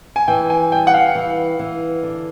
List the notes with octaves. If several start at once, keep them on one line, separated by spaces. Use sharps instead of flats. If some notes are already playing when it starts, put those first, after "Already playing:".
G#5
E3 G5
G#5
G3 G5
F#5
F5
E3
E3
D3